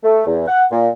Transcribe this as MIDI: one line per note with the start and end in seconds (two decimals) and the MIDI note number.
0.04 0.25 57
0.26 0.45 40
0.48 0.64 78
0.72 0.89 46